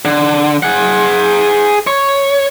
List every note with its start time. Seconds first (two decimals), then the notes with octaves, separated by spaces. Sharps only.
0.05 D3
0.63 G#4 F#5
1.87 C#5